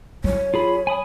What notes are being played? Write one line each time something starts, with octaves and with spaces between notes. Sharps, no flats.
F#3 E4 C#5
F4 G#4 B5
G#5 B5 D#6